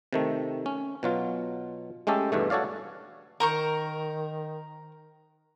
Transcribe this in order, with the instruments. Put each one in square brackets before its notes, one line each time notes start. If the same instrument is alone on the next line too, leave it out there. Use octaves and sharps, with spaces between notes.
[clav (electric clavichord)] C3 D#3 A3
C#4
B2 F#3 F4
G#3 A3 C#4 G4 A4
E2 G2 B2 A3
F#4 A4 C#5 D5 F5
[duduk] D#3 [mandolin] A#4 C5 C#6 [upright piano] A#5